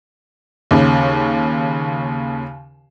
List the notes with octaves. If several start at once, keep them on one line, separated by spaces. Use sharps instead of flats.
D#2 C#3